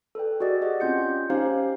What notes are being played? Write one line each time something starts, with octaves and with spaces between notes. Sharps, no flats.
A4 B4 D5 G5
F#4 G#4 D5 D#5
G4 D#5 F#5
C4 C#4 F4 G6 C#7
C#4 D#4 G4 C5 F5